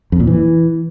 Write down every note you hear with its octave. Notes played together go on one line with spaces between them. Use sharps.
F2
A#2
E3